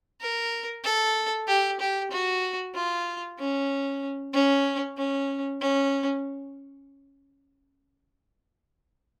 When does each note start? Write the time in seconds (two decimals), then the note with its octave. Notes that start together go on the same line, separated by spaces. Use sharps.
0.21 A#4
0.85 A4
1.48 G4
1.80 G4
2.11 F#4
2.75 F4
3.39 C#4
4.34 C#4
4.98 C#4
5.61 C#4